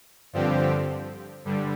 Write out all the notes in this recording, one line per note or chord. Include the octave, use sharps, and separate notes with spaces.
G2 D3 F3 C4 G4
G2 D3 G3